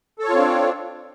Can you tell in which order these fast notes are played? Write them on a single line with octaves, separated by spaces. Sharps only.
A4 C#5 F4 C4 D4